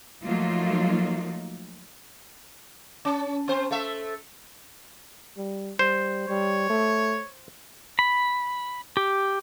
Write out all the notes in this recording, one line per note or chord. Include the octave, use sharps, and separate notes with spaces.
F3 F#3 A3 A#3 D#4 F4
C#4
C4 C5
A3 E5
G3
G3 C5
G3 C#5
A3
B5
G4